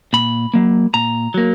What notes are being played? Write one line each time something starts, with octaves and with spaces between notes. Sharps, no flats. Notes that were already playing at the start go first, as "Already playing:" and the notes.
A#2 B5
F#3 A#3
A#2 A#5
F#3 A#3